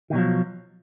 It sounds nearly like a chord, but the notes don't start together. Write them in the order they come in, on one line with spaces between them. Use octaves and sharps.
D#3 B2 F#3 F3